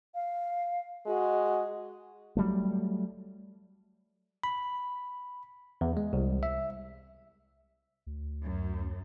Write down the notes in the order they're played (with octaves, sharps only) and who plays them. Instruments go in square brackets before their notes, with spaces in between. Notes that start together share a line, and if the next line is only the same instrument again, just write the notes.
[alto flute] F5
[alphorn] G#3 [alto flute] F#4
[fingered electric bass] F#3 G3 A3
[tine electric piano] B5
E2
G#3
C2
E5
[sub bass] D2
[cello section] F#2